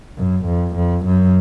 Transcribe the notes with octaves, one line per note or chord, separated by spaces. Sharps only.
F#2
F2
F2
F#2